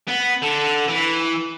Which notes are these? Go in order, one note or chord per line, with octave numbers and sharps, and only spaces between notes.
B3
D3
E3